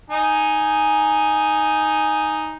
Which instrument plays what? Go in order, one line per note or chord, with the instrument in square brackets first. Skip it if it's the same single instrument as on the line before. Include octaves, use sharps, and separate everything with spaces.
[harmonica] D#4 G#5